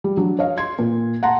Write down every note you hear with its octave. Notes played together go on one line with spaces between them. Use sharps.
G3
F#3 D4
C#5 D#5 F5
C6 G#6
A#2
F#5 A5 A#5 C6